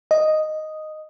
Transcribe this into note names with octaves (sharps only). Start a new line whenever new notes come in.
D#5